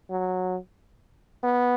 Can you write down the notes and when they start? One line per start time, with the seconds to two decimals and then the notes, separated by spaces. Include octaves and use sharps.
0.10 F#3
1.43 B3